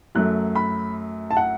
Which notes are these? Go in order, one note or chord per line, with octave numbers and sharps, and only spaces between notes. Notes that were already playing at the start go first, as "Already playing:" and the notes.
F#2 F#3 A3 F#6
B5
A5
F#5